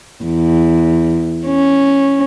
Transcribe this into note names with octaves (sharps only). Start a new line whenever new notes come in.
E2
C#4